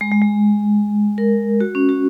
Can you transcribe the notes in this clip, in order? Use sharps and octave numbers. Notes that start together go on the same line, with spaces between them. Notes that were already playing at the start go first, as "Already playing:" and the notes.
G#3
G#3
G#3
A#4
F#4
C#4
F#4